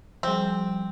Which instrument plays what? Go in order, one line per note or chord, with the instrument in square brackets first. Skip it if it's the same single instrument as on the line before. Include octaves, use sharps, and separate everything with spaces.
[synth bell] F3 G3 [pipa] C4